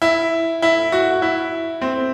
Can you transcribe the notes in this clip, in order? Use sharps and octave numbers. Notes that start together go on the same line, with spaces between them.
E4
E4
F#4
E4
C4